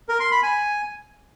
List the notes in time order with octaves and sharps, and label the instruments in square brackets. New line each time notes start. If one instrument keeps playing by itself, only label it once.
[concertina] A#4
C6
B5
G#5